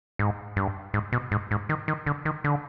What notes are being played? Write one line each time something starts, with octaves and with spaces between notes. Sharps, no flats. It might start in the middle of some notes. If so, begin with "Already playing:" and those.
G#2
G2
G#2
B2
G#2
G#2
D#3
D#3
D3
D#3
D3